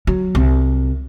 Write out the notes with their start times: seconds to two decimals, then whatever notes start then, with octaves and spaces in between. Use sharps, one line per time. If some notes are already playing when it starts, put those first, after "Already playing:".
0.07 F#3
0.35 C2